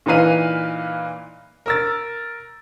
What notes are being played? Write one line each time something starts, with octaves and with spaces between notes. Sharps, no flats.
A#2 E3 D#4 B4 F5 D#7
A#4 E6 A6